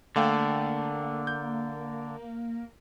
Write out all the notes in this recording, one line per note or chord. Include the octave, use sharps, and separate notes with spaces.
D3 A3 A#3 F5 G5
G6